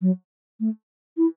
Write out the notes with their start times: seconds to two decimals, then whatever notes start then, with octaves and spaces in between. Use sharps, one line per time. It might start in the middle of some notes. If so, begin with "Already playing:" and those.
0.02 F#3
0.60 A3
1.17 E4